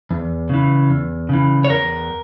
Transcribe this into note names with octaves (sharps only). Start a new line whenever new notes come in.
E2
C#3 E3
E2
C#3 E3
C#5
E2 A#4